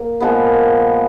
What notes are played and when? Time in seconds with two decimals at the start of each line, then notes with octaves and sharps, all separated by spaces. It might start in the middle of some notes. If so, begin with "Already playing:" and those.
Already playing: A#3
0.20 A#2 F3 G#3 B3